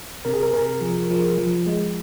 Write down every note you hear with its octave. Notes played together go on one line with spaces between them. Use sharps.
C3 A#4
G#4
A#4
C3 A#4
F3
F3
F3
G#3